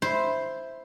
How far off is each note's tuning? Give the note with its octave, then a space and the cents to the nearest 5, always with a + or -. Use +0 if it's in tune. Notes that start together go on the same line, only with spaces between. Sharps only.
E4 +0 C5 +0